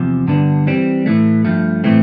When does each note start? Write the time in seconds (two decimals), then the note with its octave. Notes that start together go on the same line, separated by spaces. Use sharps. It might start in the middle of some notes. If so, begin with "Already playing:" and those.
Already playing: E2 C3 F3
0.28 G2 D3 G3 B3 D4
0.67 E3 G3 C4
1.06 A2 E3 A3
1.45 G2 F3 A3
1.84 A2 E3 A3 C4